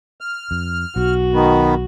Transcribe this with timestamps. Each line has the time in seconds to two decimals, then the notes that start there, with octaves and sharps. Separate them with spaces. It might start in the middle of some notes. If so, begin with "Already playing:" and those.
0.21 F6
0.51 F2
0.96 B1 F#4
1.34 D#3 B3